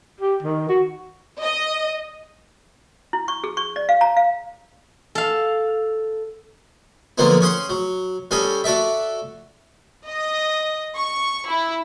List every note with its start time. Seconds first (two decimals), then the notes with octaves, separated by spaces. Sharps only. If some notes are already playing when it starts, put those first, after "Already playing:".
0.21 G4
0.43 D#3
0.69 F#4
1.41 D#5
3.13 E4
3.28 C#6
3.44 G#4
3.57 C#6
3.76 D5
3.89 F5
4.01 A#5
4.17 F5
5.15 A4 F5
7.18 D3 F3 F#3 G#3 A#3 B3
7.41 C#4 G#4 F#5 C6
7.69 F#3
8.31 G3 C#4 G#4 A4
8.64 F#4 A4 D5 E5
10.06 D#5
10.94 C#6
11.47 E4